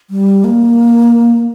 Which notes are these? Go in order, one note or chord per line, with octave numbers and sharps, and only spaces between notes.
G3
A#3